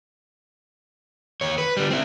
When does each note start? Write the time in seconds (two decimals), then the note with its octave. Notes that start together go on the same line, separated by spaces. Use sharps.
1.41 D#2 C#5
1.58 B4
1.77 D3 G3
1.91 C4 E4